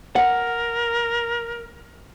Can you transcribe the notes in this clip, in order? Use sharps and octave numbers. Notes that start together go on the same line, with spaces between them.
A#4 F#5